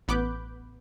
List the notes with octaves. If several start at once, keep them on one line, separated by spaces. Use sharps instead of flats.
A1 B3 B5 D6 F#6 G6